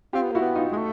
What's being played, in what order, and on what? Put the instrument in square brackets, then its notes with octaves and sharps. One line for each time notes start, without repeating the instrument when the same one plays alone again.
[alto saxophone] C4 [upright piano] F4 G4
[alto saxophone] B3
[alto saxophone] A#3 [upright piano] E4 F#4
[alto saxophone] B3
[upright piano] D#4 F4
[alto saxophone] G#3
A3